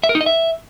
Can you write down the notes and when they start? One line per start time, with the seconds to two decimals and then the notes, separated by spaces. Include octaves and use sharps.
0.04 E5
0.09 A#4
0.15 D#4
0.21 D#5
0.26 E5